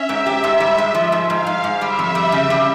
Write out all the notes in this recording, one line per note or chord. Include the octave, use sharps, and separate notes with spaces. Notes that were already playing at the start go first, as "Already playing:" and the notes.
Already playing: C#4 E5
G#2
G4
G#2
G3
G#3
F3
G#2
G#2 F5
G#2
G#2
G3 E5
F2
G3
C#3
G3